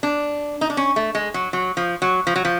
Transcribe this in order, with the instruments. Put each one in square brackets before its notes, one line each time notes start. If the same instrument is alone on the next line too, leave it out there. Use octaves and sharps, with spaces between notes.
[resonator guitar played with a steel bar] D4
D#4
D4
C#4
A3
G#3
F#3
F#3
F3
F#3
F3
F#3
F3